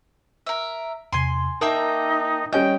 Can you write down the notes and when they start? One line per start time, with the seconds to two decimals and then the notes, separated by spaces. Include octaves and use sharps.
0.47 A#4 E5
1.13 E2 C3 G#5 C6
1.61 A#3 D#4 A#4 E5 G5 A5 D#6
2.53 G3 C#4 D#5 G5 G6